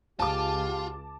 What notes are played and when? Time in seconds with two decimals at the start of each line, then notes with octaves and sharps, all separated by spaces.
0.20 C#2 F4 G4 A5 D6